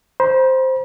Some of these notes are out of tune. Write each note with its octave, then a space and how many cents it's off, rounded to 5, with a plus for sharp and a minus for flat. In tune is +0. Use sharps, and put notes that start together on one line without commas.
C5 +0 B5 -45